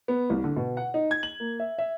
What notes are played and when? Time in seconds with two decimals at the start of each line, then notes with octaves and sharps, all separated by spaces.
0.08 B3
0.30 C2
0.44 D3
0.56 B2
0.77 F#5
0.94 D#4
1.11 G#6
1.23 F#7
1.40 A#3
1.60 E5
1.78 E5